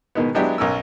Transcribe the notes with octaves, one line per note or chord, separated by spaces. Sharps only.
B2 D#3 G#3 B3
F#3 G#3 B3 D4 E4 G4
B1 C#4 A#4 E6